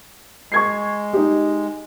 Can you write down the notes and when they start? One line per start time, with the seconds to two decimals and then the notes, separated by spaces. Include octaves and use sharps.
0.52 G#3 C#6 G#6 C7
1.13 D#4 G4